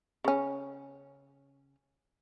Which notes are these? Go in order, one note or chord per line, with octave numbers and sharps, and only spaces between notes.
C#3 C#4